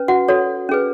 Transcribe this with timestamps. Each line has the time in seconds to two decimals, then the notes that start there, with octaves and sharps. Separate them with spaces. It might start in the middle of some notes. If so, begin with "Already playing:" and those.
Already playing: C#4 B4
0.08 F#4 F#5
0.28 F#4 A4 C#5
0.69 C#4 G#4 B4